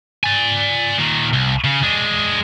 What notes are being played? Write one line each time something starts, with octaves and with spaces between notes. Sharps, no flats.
D5 G#5
A#2 D#3
C2
C#3
G#3 D4